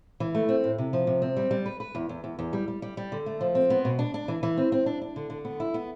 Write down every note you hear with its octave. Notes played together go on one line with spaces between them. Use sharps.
E3
A3
C4
A2
C3
F3
C3
C4
G3
G3
B4
B4
E2
E2
E2
E2
G3
G3
G3
G3
D3
A3
F3
C4
B3
B2
D4
D4
E3
E3
C4
C4
D4
D4
D3
D3
B3
E4
B3